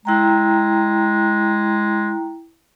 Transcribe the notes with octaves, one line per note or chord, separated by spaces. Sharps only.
G#3 E4 G5 A#5